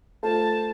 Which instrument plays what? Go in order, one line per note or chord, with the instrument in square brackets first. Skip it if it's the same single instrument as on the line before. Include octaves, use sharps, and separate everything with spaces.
[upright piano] A3 F4 A4 C5 [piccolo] A5